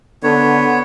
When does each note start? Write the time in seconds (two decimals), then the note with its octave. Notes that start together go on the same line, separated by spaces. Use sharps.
0.23 D3 B3 C#5